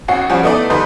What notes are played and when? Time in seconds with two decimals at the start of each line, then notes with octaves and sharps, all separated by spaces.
0.08 G#1 C#4 F#4 C7
0.30 F3 G3 C#4 F#4
0.43 A3 B3 D#4 E4 D5
0.70 D3 G3 D#4 B4 C6 G6